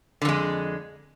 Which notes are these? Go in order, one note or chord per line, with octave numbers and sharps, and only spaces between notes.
F2 D3 G#3